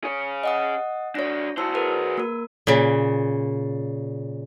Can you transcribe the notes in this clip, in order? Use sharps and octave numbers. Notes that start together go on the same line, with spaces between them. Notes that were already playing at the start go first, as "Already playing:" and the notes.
G#4 C#5
D#5 F#5 D#6
D4 F#4 C#5 A#6
E4 F#4 C5 A5 E6
G#4 A#4 B4
A#3 A#4
A#2 C#3